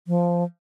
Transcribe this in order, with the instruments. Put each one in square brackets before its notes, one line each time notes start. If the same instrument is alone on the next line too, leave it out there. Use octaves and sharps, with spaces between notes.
[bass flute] F3